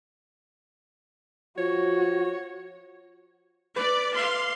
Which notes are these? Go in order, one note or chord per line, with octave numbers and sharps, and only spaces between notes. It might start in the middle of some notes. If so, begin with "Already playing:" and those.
F3 F#4 C#5
B4 D5
F5 C6